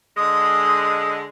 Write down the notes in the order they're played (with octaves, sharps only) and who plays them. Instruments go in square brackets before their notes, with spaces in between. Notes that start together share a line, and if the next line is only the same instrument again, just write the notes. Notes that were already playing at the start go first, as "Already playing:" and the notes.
[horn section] D3 G#3 [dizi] D#6